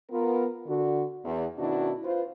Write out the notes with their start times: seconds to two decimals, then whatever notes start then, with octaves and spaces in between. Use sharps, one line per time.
0.10 B3 F4 A#4
0.66 D3 F#4
1.24 E2
1.58 B2 D#3 C#4 D4 E4 F#4
2.03 F4 B4 C5